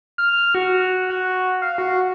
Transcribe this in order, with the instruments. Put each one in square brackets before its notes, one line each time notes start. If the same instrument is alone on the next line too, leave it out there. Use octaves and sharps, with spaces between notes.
[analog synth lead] F6
F#4
F#4
F5
F#4